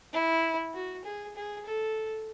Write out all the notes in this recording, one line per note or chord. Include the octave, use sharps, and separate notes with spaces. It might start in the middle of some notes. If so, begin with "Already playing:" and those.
E4
F#4
G#4
G#4
A4